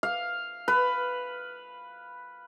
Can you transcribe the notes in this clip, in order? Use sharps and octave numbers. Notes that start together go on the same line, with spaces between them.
F5
B4